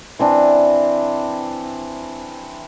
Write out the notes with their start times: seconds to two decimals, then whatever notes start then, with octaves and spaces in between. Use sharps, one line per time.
0.19 E3 C4 D4